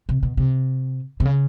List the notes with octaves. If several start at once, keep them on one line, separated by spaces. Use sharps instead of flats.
C3
B2
C3
C3
C#3